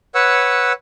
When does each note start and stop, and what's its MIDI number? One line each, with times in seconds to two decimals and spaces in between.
0.15 0.72 71
0.15 0.72 73
0.15 0.72 78
0.15 0.72 88